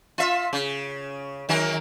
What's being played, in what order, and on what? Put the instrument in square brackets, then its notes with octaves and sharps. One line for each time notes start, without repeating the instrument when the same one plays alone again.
[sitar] F4 E5
C#3
D#3 F#3 A#4